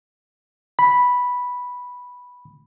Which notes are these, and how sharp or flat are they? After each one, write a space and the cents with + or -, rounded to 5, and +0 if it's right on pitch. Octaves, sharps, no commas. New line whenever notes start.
B5 -5